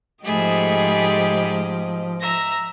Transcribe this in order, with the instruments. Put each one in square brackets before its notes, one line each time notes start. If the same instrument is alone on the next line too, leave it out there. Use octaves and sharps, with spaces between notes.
[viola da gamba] G#2 G4 D#5 [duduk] F3 [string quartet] A3 G#4 B5
[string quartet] E5 A#5 A#6